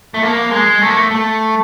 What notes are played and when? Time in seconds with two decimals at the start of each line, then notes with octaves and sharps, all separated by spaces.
0.14 A3
0.22 A#3
0.51 G#3
0.82 A3
0.88 A#3
0.97 A3
1.11 A3